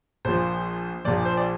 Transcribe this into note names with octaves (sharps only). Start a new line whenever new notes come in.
A#1 A#2 F3 C5
A#1 A#2 F3 D5
C5
D5